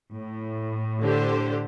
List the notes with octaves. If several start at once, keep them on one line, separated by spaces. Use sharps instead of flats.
A2
D3 G4 C5